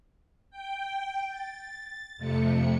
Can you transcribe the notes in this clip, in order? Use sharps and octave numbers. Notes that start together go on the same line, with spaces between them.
G5
A6
F2 C3 A3 C#7